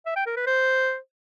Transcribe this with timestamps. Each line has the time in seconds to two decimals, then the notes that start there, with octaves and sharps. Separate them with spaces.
0.06 E5
0.16 G5
0.26 A#4
0.37 B4
0.47 C5